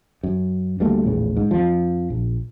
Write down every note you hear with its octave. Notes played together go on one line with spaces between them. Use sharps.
F#2
D2 G3 A3 A#3
A#1 E2 A2 C#3
G#2
F2 F3
A#1